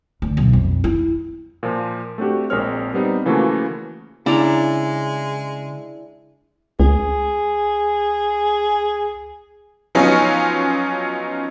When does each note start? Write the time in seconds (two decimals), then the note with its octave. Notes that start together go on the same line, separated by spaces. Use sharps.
0.22 D2
0.37 B1
0.53 F2
0.84 E4
1.63 A#2 F3
2.18 A3 C4 D4 F#4 G4
2.50 A#1 G#3 C4 A#4 C#5 F6
2.94 G3 B3 C4 D#4
3.26 C#3 E3 F3 A3 A#3 F#4
4.26 C#3 G#3 D4 E4 D5 A#5
6.80 C#2 G#4
9.95 F3 F#3 B3 C#4 D#4 F4